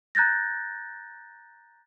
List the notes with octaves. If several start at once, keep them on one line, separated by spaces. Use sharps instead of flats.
A#5 F#6 G6 A6 A#6